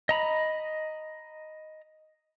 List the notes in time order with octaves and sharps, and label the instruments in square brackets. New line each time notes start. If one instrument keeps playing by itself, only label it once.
[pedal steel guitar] D#5 A#5 B5